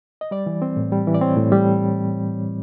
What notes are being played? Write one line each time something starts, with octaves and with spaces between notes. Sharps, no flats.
D#5
G3 D5
E3
C4
A2
G3
E3
D5
C4 C#5
A2
G3